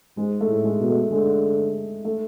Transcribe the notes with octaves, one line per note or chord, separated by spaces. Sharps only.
G#2 G#3
A3
A2
G#3
B2
A3
D3 G#3
A3